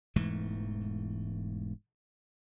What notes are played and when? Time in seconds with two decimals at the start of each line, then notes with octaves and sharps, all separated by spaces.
0.16 E1 G#2 E3 A3